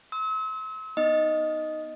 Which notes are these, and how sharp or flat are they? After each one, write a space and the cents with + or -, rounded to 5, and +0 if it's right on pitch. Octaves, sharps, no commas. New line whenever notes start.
C6 +0 E6 -40
B3 +0 D#4 +0 D#5 +0